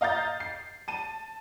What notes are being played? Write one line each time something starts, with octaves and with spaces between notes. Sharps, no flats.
D#5 F5 A#5 G6 A6
C7
A5 D#7